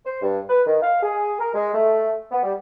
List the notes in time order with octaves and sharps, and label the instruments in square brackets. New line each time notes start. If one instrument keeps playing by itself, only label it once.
[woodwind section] C5
G2
B4
D#3
F5
G#4
A#4
G#3
A3
B3
G3